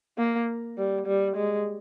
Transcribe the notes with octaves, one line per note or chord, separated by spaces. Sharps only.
A#3
G3
G3
G#3